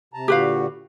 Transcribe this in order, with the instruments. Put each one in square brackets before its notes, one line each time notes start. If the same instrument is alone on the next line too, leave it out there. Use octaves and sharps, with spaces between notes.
[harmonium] C3 A5 A#5
[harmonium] A#2 D3 F#4 [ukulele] G4 B4 F5